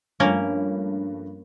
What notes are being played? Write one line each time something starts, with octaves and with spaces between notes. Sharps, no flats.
G2 F3 A3 A#3 C#4 A#4